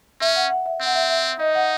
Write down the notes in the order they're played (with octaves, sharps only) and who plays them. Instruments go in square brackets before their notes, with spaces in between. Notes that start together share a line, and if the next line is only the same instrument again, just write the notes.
[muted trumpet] C#4 [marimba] E5
[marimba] F#5
F#5
E5
[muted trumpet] C4
[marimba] F#5
E5
E5
[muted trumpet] D#4 [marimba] D#5
[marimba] F#5